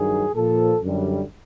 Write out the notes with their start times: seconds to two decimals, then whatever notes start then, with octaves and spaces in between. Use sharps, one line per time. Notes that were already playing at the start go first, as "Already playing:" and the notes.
Already playing: G2 D#3 F#3 G#4
0.35 A#2 F3 A4
0.83 F#2 D3 G3